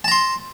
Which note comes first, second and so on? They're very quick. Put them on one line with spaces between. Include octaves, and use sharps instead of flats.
A5 A#5 C6